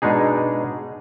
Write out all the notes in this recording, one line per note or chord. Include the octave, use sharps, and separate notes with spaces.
B2 G#3 D4 D#4 G#4